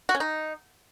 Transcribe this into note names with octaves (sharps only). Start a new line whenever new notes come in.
F#4
C#4
D#4